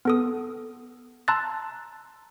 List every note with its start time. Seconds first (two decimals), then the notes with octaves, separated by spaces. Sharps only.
0.05 B3 A4 D#6
1.28 A5 A#5 C6 E6 F#6 A6